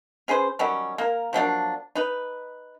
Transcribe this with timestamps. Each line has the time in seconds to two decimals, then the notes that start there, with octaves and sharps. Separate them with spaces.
0.28 C#4 G#4 B4 C5
0.59 D#3 F#3 G3 C#4
0.98 A#3 A#4
1.33 F3 F#3 A#3 D4
1.95 D#4 B4